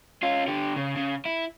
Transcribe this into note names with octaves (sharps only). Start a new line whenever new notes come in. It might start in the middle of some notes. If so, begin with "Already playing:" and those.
C#4 F4
D3 G4
C#3
C#3
E4